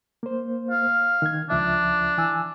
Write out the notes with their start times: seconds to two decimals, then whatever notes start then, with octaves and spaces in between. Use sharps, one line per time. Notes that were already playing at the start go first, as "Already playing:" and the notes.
0.23 A#3 C5
0.71 F5
1.22 D#3 G#6
1.50 C#2 F3 D4 E5
2.18 E3 G#5 E6